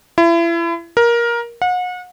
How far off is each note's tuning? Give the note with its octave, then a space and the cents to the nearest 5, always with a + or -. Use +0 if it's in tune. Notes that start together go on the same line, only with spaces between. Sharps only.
E4 +35
A#4 +15
F#5 -35